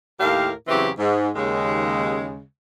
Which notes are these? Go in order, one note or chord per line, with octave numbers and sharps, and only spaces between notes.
D#2 A2 G4 A#4 F5
E2 C#3 E3 F#3 C4 G4
G#2
D#2 C#3 G#3